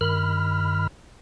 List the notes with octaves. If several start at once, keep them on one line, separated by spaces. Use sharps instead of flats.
G2 D#3 B5 F6